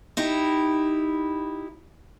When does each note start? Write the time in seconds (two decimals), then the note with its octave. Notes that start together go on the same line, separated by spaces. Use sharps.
0.17 D#4 E4 G4